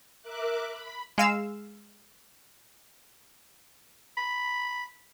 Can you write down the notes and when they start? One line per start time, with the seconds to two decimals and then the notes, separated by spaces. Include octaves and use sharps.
0.22 A#4 E5 D6 F#6
0.68 B5
1.18 G#3 F5 E6
4.17 B5